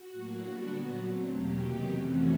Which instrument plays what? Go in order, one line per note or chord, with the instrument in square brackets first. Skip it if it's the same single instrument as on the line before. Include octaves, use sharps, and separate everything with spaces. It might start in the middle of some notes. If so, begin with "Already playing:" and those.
Already playing: [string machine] F#4
A2 F#3 A#3
D3 G3 B3 D4 F#4
A#2 F#3 B3
D3 F#3 A3 C4
E2 B2 F#3 A#3 C#4 G4
C3 D#3 F#3 B3 D#4
F2 C3 E3 A3 C#4 F#4